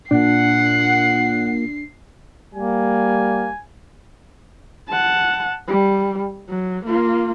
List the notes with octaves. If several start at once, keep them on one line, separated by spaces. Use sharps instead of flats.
A#2 D4 F#5 C7
G3 A#3 G#5
F#5 A5
G3
F#3
A#3 F4